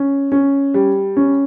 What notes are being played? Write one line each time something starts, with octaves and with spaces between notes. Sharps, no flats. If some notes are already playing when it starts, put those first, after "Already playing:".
Already playing: C#4
C#4
G3
C#4